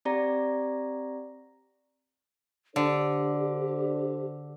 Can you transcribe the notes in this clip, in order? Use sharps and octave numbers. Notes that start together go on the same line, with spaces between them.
C4 G4 D5 A#5 A#6
D3 D4 G4 A4 C5